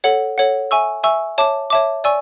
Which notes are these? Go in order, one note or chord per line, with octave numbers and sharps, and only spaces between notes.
A4 C#5 F#5
A4 C#5 F#5
E5 G#5 C#6 E6
E5 G#5 C#6 E6
C#5 E5 A5 D6
C#5 E5 A5 D6
D5 G#5 C#6 E6